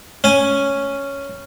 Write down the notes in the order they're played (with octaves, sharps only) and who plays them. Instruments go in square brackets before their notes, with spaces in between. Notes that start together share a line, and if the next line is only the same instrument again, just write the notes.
[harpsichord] C#4 G#5